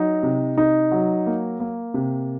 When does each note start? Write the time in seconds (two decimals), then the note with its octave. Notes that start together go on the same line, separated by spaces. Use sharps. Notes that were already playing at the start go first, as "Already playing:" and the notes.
Already playing: F#3 D#4
0.23 C3
0.57 D#4
0.91 F#3
1.26 A#3
1.60 A#3
1.94 C3